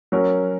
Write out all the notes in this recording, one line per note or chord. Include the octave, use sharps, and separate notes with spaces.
F#3 C#4 F#4 A#4